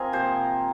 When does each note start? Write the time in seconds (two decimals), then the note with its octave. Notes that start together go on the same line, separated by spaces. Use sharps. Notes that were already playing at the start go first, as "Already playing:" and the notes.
Already playing: C4 F4 G#4 A#4
0.12 C3 F3 A#3 C5